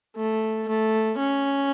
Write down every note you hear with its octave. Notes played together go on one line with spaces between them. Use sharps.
A3
A3
C#4